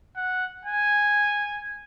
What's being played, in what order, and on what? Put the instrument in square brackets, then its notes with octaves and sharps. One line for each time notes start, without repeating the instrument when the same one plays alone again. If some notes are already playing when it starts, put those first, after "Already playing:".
[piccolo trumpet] F#5
G#5